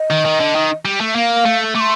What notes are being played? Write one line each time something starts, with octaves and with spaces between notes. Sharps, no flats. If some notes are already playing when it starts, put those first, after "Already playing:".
Already playing: D#5
D#3
D#3
D3
D#3
G3
A3
A#3 F5
A3
A3 D6
C6